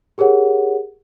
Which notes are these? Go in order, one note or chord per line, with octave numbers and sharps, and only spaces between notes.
G4 G#4 A#4 C#5 F#5